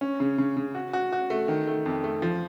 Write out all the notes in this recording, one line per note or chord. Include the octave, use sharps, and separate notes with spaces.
C#4
C#3
C#3
C#3
F#4
F#4
F#4
A3
D#3
A3
F2
A3
F3